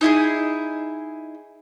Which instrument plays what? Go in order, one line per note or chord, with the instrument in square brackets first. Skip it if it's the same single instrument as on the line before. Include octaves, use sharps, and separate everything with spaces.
[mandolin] D#4 E4 F#4 G#4